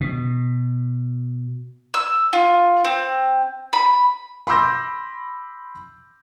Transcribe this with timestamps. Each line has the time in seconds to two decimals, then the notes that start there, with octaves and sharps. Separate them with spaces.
0.01 B2
1.94 E6
2.33 F4
2.85 C4
3.73 B5
4.47 B5 C6 D6 E6 G6 A#6